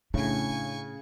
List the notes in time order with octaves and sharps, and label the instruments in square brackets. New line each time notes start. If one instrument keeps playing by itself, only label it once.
[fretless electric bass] A2 [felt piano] C#3 [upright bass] D4 [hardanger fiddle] G#5 C#6